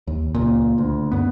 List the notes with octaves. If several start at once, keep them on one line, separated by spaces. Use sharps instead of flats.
D#2
C#2 A#2
D2
F#2 B3